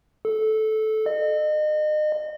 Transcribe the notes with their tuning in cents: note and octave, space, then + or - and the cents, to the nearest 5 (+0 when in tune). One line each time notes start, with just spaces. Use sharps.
A4 -15
D#5 -35